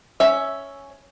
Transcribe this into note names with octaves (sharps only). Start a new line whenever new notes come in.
C#4 E5